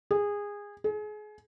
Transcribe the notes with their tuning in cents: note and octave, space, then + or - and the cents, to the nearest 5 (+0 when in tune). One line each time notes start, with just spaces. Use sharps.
G#4 -20
G#4 +30